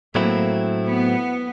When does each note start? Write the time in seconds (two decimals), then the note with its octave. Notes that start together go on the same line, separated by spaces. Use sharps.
0.15 A2 F#3 A3 A#3 C4 E4
0.87 B3